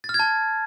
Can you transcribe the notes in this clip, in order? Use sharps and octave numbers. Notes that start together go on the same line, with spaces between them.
A6
F6
G#6
A5